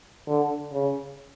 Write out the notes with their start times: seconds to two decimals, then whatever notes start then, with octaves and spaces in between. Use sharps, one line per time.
0.28 D3
0.72 C#3